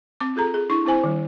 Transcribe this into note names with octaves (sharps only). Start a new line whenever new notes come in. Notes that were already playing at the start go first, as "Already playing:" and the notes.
C4 D6
F4 G#4 A4 A#5
G#4
D4 E4 C6 C#6
C4 E4 C5 G#5
D#3 G3